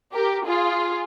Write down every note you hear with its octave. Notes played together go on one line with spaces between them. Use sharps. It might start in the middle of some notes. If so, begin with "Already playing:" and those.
G4 A#4
F4 G#4